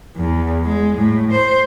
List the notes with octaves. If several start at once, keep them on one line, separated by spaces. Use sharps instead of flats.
E2
G#3
A2
C5